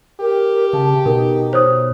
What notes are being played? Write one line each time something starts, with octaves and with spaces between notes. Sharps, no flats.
G4 A#4
C#3 A5
B2 D#4 A#4
C5 C#5 D#6